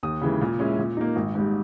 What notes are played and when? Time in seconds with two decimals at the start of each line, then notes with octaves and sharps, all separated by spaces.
0.03 D#2 D#6
0.21 C#3 E3 G#3
0.41 A#2
0.59 G#3 C#4 E4
0.79 A#2
0.97 A#3 D#4
1.16 G#1
1.35 G#2 G3